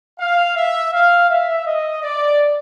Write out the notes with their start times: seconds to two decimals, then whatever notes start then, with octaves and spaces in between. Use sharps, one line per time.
0.19 F5
0.56 E5
0.93 F5
1.29 E5
1.66 D#5
2.03 D5